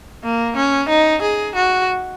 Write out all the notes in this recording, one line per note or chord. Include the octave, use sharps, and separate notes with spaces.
A#3
C#4
D#4
G#4
F#4